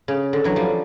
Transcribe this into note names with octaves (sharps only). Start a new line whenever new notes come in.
C#3
D3
E3 F#3
F3 G3